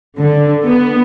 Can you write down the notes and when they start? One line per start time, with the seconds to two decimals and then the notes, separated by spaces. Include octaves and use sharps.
0.20 D3
0.65 B3